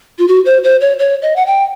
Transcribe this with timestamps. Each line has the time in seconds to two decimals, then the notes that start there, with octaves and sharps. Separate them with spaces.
0.19 F4
0.28 F#4
0.46 C5
0.64 C5
0.81 C#5
0.99 C#5
1.22 D#5
1.36 F#5
1.46 G5